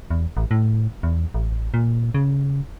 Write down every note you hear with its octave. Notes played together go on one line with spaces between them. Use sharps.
E2
A1
A2
E2
A1
A#2
C#3